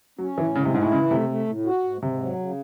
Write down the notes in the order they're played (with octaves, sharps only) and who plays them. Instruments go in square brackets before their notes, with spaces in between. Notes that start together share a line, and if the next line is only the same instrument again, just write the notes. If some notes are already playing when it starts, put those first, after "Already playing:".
[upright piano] F#3 [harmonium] C#4
[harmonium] A2 [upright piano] E3
[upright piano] C#3 [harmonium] G#3
[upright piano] C3
[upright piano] G#2 [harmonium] E4
[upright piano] A2
[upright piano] C#3 [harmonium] E3
[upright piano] C3 [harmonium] A3
[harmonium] A3
A2
F#4
G#2
[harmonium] G#2 [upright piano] C3
[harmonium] F#3
C#3